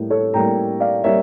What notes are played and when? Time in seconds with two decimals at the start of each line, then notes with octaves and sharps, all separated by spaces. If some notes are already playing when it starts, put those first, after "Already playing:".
Already playing: A2 G3 A#3
0.10 A4 C#5
0.34 A2 G3 A#3 G5 A#5
0.80 D5 F5
1.04 G3 A#3 C#5 E5